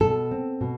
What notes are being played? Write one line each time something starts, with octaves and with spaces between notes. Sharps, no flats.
B2 A4
C4
B2